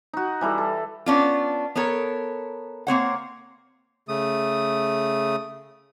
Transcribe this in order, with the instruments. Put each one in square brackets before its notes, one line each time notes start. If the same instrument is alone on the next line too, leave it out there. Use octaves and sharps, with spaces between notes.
[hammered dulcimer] D#4 F#4
E3 G3 E4 A4
A4
[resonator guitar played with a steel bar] B3 C#4 D4 F4
B3 A4 A#4 C#5
A#3 C4 C#5 F#5
[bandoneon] C#3 A3 D#6